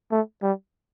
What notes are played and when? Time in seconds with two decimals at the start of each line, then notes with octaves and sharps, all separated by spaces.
0.11 A3
0.43 G3